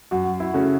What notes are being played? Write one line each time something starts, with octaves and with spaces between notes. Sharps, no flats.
F#2 F#4
E4
C#3 A3 C#4 F#4